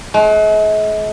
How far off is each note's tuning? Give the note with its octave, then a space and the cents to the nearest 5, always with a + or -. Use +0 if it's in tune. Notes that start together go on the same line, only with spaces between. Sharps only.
G#3 +45